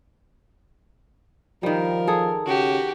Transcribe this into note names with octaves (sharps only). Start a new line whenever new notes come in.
D#3 F3 G3 A#4
G#4 A4
C#3 F#4 G4